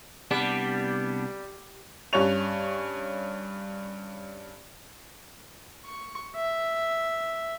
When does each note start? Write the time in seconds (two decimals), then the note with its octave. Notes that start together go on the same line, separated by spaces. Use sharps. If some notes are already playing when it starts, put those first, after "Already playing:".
0.31 C2 G3 B3 D4
2.13 G2 C#4 C#5 F7
5.85 C#6
6.36 E5